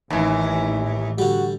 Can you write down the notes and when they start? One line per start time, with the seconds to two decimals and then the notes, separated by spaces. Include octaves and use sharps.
0.10 A1 D#2 E3
1.18 D3 G3 F#4